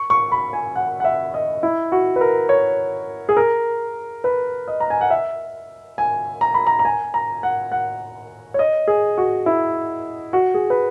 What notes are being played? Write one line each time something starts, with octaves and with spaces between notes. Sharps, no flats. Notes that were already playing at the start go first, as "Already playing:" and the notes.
Already playing: C#6
C#6
B5
G#5
F#5
F#5
E5
D#5
E4
F#4
B4
A#4
C#5
G#4
A#4
B4
D#5
A#5
G#5
F#5
E5
G#5
A#5
B5
A#5
A#5
G#5
A#5
F#5
F#5
C#5
D#5
G#4
F#4
E4
F#4
G#4
B4